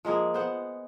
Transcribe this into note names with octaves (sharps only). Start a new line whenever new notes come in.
F3 G#3 A#3 G#4
B3 C5 F#5